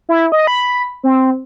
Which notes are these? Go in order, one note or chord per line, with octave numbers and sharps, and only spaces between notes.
E4
D#5
B5
C4